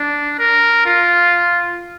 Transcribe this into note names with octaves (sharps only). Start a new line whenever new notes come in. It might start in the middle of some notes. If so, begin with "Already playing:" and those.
Already playing: D4
A#4
F4